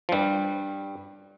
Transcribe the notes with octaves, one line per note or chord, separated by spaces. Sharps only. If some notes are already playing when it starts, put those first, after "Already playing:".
F3
G2 G3